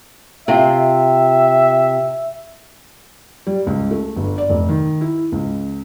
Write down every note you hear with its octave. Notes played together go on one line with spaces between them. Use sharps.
C3 F4 E5 G5
G3
C#2
A3
G1
D5
F1
D#3
E4
C#2